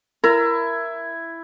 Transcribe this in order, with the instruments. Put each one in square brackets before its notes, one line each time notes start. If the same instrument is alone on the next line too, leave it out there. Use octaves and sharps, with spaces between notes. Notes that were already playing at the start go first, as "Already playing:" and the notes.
[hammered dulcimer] E4 [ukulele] A#4